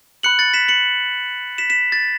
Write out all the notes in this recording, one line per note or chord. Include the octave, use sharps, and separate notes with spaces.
B5 F#6 C#7 F#7
A6 C#7
B6 E7
C#7 F#7
B6 E7
B6 E7
A6